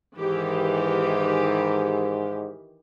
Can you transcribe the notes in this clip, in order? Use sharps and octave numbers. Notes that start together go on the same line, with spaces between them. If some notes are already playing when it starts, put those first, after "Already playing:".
G#2 D#3 E3 G4